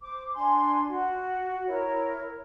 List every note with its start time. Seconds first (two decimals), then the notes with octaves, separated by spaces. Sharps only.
0.01 C5 D6
0.35 D4 G#5 C6
0.88 F#4
1.68 E4 A#4 C#5